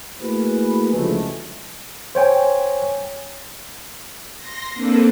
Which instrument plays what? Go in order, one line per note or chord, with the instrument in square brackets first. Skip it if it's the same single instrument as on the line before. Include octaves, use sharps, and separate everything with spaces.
[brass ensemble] A3 A#3 E4 F#4 G#4 B4
C#2 D3 F3 F#3 G#3 A3
[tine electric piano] C5 C#5 G5 G#5
[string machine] C6 A#6
A#3 C4 D4 A4 B4